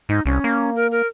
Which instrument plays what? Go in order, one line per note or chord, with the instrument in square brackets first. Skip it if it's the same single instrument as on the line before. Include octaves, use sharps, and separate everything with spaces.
[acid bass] G#2 [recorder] D#4
[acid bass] C2 [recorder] C#4
[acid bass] A#3
[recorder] A#4
A#4